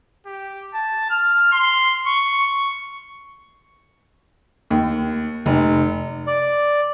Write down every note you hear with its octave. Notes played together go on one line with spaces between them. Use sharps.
G4
A5
F6
C6
C#6
D#2
F1
D5